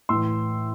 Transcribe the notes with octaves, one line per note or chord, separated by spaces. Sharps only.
A2 E3 C6 E6